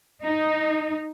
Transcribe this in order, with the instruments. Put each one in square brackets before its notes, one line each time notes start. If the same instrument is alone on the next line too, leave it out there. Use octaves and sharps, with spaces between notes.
[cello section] D#4